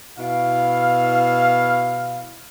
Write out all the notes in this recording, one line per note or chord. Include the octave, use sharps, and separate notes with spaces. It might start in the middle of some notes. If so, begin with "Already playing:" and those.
B2 E4 F5